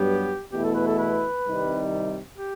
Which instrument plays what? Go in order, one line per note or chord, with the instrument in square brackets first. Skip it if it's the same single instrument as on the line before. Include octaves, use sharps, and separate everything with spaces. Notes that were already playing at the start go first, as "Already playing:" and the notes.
Already playing: [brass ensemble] G2 F#3 B3 [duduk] G4
[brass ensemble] E2 B2 A3 E4 [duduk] G4
[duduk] A4
B4
A4
B4
[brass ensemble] C2 C3 D#3 G3 D#4
[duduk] G4